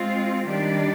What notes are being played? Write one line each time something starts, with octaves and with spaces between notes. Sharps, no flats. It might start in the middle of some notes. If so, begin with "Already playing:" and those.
Already playing: G#3 C4 F4
D#3 G3 D4 G4 D5